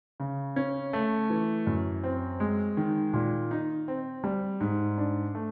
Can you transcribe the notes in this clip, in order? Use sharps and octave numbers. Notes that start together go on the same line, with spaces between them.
C#3
C#4
A3
E3
F#2
C4
G#3
D#3
A#2
D#4
C4
G3
G#2
D4
A3